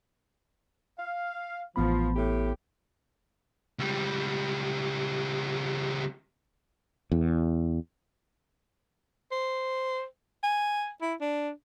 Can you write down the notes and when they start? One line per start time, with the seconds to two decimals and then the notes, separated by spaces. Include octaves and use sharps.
0.97 F5
1.76 A1 F3 B3 B5
2.15 A2 G4
3.79 C#2 G3
7.12 E2
9.31 C5
10.43 G#5
11.01 E4
11.21 D4